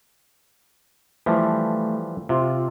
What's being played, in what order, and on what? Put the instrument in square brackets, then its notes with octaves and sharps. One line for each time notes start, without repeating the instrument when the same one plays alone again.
[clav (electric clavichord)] E3 F3 G3 [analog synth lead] A3
[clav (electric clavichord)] C3 [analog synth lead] F4